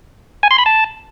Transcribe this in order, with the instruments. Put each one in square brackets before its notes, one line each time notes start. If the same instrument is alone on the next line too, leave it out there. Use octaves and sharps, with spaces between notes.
[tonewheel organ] G#5
C6
B5
A5